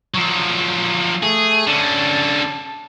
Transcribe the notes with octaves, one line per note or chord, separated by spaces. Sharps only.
F3 F#3
A3 G#4
D3 C#4 A5